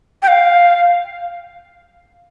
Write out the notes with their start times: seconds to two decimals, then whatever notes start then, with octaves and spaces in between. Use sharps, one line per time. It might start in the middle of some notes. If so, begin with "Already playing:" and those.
0.22 G5
0.28 F5